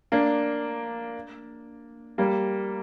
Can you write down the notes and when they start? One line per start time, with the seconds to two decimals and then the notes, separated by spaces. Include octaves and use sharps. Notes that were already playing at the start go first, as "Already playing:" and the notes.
0.12 A#3 D4
2.18 G3 A#3